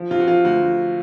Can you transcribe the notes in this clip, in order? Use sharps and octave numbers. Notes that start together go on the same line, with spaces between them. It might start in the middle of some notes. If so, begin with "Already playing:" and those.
Already playing: F3
C3 F4
F#4
F3 F4
D2 F#4
D2